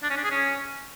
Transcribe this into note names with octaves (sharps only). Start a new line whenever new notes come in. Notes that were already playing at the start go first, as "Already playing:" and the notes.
D4
C#4
D4
G#4
C#4